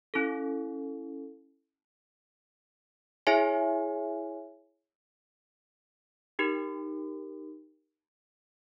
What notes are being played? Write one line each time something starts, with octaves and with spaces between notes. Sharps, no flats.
C#4 E4 A4
E4 G#4 C#5 E5 G#5
D#4 G4 A#4